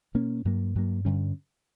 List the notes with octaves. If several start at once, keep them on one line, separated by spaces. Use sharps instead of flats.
B2 A#3 C#4
G2 F#3 A#3
G2 F#3 A#3
G2 D3 G3 C#4